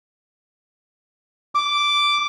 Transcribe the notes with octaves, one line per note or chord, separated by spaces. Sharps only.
D6